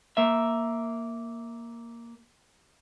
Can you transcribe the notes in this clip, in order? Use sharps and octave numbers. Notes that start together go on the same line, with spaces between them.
A#3 E5